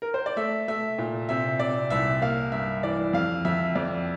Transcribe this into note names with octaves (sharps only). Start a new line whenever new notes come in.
A#4
C5
D5
A3 E5
A3 E5
A#2
C3 E5
C3 D5
C2 E5
A#3 F5
G2 E5
E3 D5
F2 F5
F2 E5
F2 D5